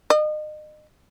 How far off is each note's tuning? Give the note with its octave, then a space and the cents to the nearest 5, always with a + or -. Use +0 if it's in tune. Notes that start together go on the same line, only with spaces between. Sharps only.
D#5 -35